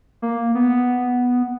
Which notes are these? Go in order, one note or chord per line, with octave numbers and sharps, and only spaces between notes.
A#3
B3